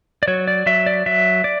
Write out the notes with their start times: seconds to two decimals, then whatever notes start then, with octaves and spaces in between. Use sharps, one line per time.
0.23 D5
0.28 F#3 C#5
0.48 D5
0.66 F#3 E5
0.86 D5
1.06 F#3 E5
1.44 D5